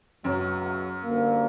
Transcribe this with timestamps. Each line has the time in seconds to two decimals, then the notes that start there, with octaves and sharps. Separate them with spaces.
0.24 C#2 F#2 B2 F#3
1.04 D2 D3 G3 A#3